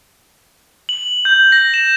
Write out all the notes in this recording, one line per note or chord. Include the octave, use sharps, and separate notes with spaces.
F#7
G6
A#6
E7